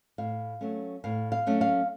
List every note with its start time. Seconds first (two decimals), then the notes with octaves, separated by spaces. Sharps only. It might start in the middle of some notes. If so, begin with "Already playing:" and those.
0.18 A2 F5
0.61 F#3 A3 C#4
1.04 A2 F5
1.32 F5
1.46 F#3 A3 C#4
1.61 F5